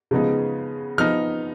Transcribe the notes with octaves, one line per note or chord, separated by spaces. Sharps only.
C#3 F3 G#3 B3 D#4
F3 B3 D#4 F6